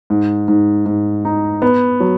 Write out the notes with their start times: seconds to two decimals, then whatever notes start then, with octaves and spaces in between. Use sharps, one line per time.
0.10 G#2
0.48 G#2
0.86 G#2
1.25 D#4
1.62 B3
2.00 F#3